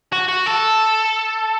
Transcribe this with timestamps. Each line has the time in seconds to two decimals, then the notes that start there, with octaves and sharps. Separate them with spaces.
0.12 F#4
0.28 F#4
0.46 A4